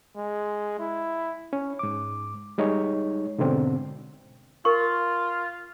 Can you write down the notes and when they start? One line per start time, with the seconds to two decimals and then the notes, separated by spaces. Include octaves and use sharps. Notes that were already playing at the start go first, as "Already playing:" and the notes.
0.17 G#3
0.80 E4
1.53 C#4
1.79 G#2 D6
2.58 G3 G#3 D#4 C#5
3.38 G#2 B2 D3 C4
4.65 F4 A#4 C#6